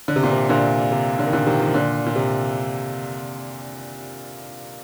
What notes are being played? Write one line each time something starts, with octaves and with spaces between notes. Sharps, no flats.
D3
C3
A#2
C3
A#2 D3
C3
D3
D#3
A#2 D3
C3 D#3
F3
D#3
A#2 D3
A#2
C3